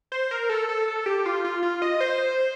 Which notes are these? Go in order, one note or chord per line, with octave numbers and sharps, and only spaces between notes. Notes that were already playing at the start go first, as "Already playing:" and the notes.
C5
A#4
A4
A4
A4
G4
F4
F4
F4
D#5
C5